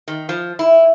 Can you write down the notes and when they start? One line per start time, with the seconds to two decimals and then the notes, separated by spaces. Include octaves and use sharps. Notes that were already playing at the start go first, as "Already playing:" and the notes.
0.08 D#3
0.29 F3
0.59 E4